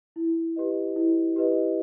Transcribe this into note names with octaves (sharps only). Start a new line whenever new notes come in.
E4
G4 B4 D#5
E4
G4 B4 D#5